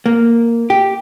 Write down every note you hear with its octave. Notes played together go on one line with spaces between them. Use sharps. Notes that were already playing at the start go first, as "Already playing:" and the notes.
A#3
G4